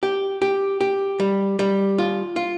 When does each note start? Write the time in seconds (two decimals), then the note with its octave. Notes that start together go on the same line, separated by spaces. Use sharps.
0.03 G4
0.42 G4
0.81 G4
1.20 G3
1.59 G3
1.98 F4
2.36 F4